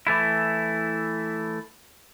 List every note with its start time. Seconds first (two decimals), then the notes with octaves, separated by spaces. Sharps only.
0.07 E3 A3 E4